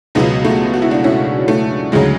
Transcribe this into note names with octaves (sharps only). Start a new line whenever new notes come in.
C#2 B2 F#3 G#3 B3
A3
F#4
E4
D4 F#4
C#4 E4
A3
D2 C#3 F#3 G#3